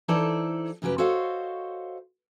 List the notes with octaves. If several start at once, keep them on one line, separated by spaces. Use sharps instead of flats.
E3 D#4 E4 A4 C5 D5
F#2 C#3 F#3 G4 B4
F#4 A4 C5 C#5 D#5 F5